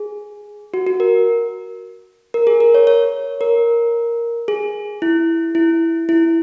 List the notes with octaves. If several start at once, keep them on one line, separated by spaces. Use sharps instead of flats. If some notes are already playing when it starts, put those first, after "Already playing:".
Already playing: G#4
F#4
F#4
A#4
A#4
G#4
A#4
C#5
C#5
A#4
G#4
E4
E4
E4